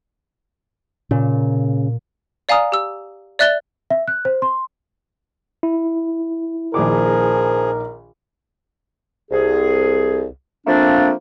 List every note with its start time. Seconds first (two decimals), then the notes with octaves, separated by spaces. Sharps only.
1.11 A#2 C#3
2.49 D5 F5 G#5 A#5 D#6 F6
2.72 G4 E6
3.39 D5 E5 F#6 A6 G7
3.90 E5
4.08 F#6
4.25 C5
4.42 C6
5.63 E4
6.74 A#1 D#3 F3 G#4 A#4 D6
9.31 C2 G#4
10.67 F3 A3 A#3 C4 D4